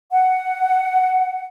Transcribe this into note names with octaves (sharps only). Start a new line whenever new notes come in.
F#5